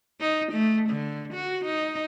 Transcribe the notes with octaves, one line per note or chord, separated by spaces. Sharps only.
D#4
A3
D3
F#4
D#4